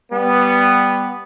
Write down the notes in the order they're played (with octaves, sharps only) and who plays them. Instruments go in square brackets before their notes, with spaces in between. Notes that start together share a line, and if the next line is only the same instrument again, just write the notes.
[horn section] G3 B3